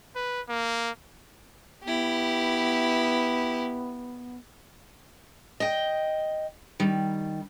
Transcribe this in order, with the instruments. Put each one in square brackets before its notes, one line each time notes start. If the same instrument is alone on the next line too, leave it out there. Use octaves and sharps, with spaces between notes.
[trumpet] B4
A#3
[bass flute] B3 [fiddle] E4 G4
[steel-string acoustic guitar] D#5 G5
D#3 G3